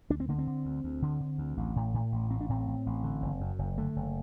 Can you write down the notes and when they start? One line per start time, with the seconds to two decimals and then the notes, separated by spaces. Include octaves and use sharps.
0.10 D2 D4
0.20 C4
0.28 D3 A#3
0.39 C4
0.47 D3
0.65 D2
0.84 D2
1.02 D3
1.21 D3
1.38 D2
1.57 A1
1.76 A2
1.94 A2
2.12 A1
2.30 A1 C4
2.41 D4
2.49 A2 C4
2.67 A2
2.86 A1
3.04 D3
3.22 F#1
3.41 F#2
3.59 F#1
3.78 D3 A3
3.96 F#1